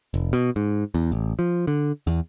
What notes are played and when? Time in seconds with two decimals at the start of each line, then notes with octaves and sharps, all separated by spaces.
0.14 F1
0.33 B2
0.56 G#2
0.94 E2
1.12 A1
1.39 F3
1.67 D3
2.07 E2